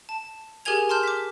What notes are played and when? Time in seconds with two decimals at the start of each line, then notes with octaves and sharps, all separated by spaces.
0.09 A5
0.65 G4 G#4 A#4 G#5 G#6 F7
0.89 A5 C6 F6 G6
1.03 D6 B6